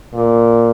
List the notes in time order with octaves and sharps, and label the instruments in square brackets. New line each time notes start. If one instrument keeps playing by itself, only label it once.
[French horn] A#2